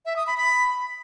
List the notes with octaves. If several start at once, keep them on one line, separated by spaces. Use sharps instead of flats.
E5
D#6
B5
B5